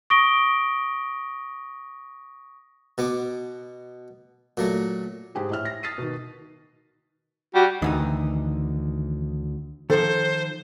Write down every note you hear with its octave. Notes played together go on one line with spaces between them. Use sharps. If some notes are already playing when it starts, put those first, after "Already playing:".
C#6 D#6 A#6 D7 G7
B2 B3 D6
A#2 F#3 A3
G#2 G4 G#4
A2 E5 F6
A#6
D#6 F6 A6 B6 C7 D#7
B2 D#3
G3 F#4
D2 D#3 E3 D#4
D#3 F3 A4 C5